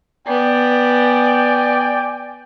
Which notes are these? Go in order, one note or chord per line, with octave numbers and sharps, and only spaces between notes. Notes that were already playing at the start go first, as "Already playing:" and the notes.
B3 D5 G5 G#5